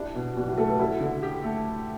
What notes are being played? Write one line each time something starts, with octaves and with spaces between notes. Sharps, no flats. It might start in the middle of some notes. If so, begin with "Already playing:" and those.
Already playing: D4 E4 G4
B2
B2 D4 F#4
E4 G4
A3 F#4 A4
G4 B4
E4 F#4 A4
D3
G4
A3